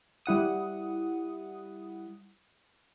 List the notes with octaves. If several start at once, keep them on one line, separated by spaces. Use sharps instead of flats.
G3 E4 F#5 D#6